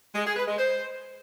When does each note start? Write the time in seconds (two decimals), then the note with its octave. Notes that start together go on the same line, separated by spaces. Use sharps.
0.15 G#3
0.25 G#4
0.36 B4
0.47 G#3
0.57 C5